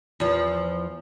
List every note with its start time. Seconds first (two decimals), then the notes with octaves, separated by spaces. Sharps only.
0.20 E2 F3